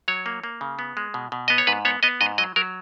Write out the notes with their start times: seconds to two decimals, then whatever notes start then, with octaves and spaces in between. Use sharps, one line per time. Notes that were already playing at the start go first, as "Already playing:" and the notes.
0.08 F#3 C#5
0.26 A#3
0.44 A#3
0.61 C#3
0.79 B3
0.97 G#3
1.14 B2
1.32 B2
1.48 B3 D#5
1.58 C#5
1.67 G#2 B4
1.85 B3 C#5
2.03 B3 D#5
2.21 G#2 D#5
2.38 F#3 D#5
2.56 F#3 A#4